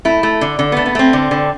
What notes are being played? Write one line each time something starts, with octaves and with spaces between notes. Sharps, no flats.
A3 E4
A3
D3
D3
B3
A3
B3
A3 C4
D3
D3